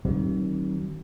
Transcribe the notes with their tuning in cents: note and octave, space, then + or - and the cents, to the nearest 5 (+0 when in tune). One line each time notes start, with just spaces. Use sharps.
D#3 +0 F#3 +40 C4 +35